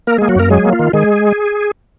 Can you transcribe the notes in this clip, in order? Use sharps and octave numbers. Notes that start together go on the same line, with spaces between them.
A#3 A#4
G#3 A#3 G#4
F#3 F#4
F#2 A#3 A#4
F#3 G#3 G#4
A#3
F4
D#3
D#3 G#3 G#4